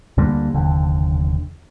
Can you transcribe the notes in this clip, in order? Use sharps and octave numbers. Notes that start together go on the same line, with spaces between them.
D2 D3 G3 A#3
F1 D#2 D3